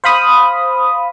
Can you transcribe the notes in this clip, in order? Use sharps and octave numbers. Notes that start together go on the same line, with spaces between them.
C5 F5 B5 D#6